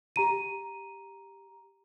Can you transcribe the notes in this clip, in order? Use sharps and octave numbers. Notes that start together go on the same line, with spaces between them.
G4 A#5 D#7